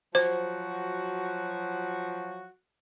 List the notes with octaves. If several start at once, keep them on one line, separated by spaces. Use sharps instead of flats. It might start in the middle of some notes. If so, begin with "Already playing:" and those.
F3 F#3 F#4 C5